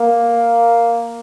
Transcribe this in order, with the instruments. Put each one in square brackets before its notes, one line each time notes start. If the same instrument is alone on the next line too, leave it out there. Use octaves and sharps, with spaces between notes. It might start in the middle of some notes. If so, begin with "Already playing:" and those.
Already playing: [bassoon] A#3